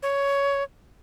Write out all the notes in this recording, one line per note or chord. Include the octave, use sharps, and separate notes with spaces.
C#5